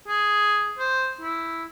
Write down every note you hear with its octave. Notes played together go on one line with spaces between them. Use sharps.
G#4
C5
E4